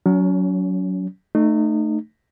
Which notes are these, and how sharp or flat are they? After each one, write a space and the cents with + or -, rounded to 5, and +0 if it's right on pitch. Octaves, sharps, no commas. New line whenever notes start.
F#3 +0 C#4 +35
A3 +5 D#4 -30